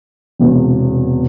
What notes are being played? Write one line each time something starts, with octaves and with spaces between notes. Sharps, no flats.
E1 E2 C3